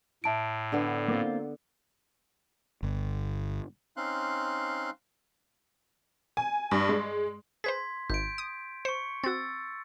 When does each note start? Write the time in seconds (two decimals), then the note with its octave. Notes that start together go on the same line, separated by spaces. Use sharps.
0.24 A2 E5 A5 D7
0.72 D3 B3
1.08 A#3 C4 F4
2.83 G1
3.97 C4 C#4 D#4 F5 C6 F#6
6.37 G#5
6.71 G2
6.89 G#3
7.64 G#4 B4 C5 C6 G#6 B6
8.10 G#1 G6 D7
8.38 D#6
8.85 C5 C#6 C#7
9.24 C4 F#4 E6 A6